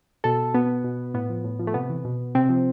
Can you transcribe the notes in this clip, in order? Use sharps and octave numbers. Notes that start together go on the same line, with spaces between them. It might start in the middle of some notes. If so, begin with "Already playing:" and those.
B2 A4
B2 B3
B2
A2 B3
F3
A2
F3
A3
C3 B3
E3
B2
C3 C4
F3